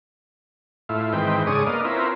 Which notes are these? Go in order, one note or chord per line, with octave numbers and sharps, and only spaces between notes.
A2 E4 F4
G#2 D#3 E3 C4 B4 G5
G#2 C#3 D4 G#4 C#6 D#6
A#3 B3 D4 D#5 F5
C4 C#4 E4 F4 A#4 B4